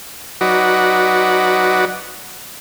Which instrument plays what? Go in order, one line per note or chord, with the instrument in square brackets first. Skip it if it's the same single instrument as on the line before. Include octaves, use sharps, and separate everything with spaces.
[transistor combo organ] F#3 D#4 F#4 B4 D5